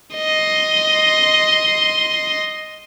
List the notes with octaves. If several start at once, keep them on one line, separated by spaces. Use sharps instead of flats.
D#5 C6